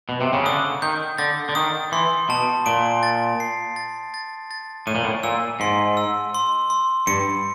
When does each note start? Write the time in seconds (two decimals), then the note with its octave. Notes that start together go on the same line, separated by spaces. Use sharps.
0.09 B2
0.21 C3
0.33 C#3
0.45 D3 D#6
0.82 D#3 G6
1.18 D3 A6
1.49 D3
1.55 D#3 D#6
1.92 E3 C6
2.29 B2 A5
2.66 A#2 D7
3.03 A6
3.40 C7
3.76 A6
4.14 A6
4.51 A6
4.87 A2 D#7
4.95 A#2
5.04 A2
5.23 A#2 E6
5.60 G#2 C6
5.97 E6
6.35 C6
6.70 C6
7.07 G2 C#7